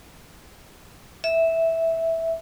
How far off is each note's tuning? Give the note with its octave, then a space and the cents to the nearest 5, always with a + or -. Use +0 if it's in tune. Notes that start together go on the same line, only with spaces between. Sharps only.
E5 -10